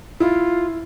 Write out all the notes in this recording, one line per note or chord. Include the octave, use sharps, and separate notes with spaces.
E4 F4